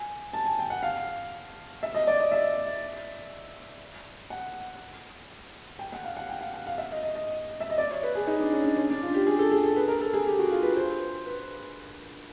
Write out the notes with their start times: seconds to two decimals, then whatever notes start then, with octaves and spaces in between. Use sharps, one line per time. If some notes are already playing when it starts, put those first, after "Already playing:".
Already playing: G#5
0.33 A5
0.46 G#5
0.59 G5
0.70 F#5
0.83 F5
1.83 E5
1.95 D#5
2.07 D5
2.20 D#5
2.32 E5
4.30 F#5
5.79 G5
5.92 F#5
6.04 F5
6.17 F#5
6.29 G5
6.41 F5
6.54 F#5
6.67 F5
6.78 E5
6.92 D#5
7.03 D#5
7.15 D#5
7.60 E5
7.70 D#5
7.78 D5
7.91 C#5
8.03 B4
8.15 G#4
8.27 D#4
8.40 D4
8.52 C#4
8.64 D4
8.77 C#4
8.90 D4
9.02 F4
9.14 G4
9.27 G#4
9.39 A4
9.52 G#4
9.64 A4
9.76 B4
9.88 A#4
10.01 A4
10.14 G#4
10.27 G4
10.39 F#4
10.51 F4
10.63 B4
10.76 C5
11.26 B4